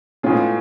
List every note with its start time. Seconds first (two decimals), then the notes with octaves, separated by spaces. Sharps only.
0.23 A2 G#3 B3 C#4 F4 G#4